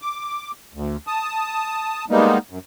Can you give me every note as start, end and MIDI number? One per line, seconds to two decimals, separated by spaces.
0.02 0.51 86
0.74 0.97 38
1.07 2.05 81
1.07 2.05 87
2.10 2.38 55
2.10 2.38 56
2.10 2.38 58
2.10 2.38 59
2.10 2.38 63
2.50 2.59 42